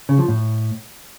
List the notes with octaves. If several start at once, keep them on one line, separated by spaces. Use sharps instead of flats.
C#3
F3
A2